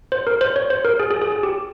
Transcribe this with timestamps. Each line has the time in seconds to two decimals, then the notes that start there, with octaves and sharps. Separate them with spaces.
0.12 C5
0.27 A#4
0.41 C5
0.56 C#5
0.70 C5
0.85 A#4
1.00 G#4
1.11 G#4
1.22 G#4
1.32 G#4
1.43 G4